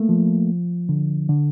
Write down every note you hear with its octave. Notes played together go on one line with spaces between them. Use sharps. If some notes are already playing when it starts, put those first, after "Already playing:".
Already playing: A3 A#3
F3
D3
D3